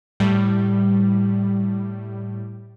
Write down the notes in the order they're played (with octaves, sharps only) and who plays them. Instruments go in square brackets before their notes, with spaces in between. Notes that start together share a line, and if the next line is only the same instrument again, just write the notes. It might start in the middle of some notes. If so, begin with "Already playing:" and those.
[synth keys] A2 G3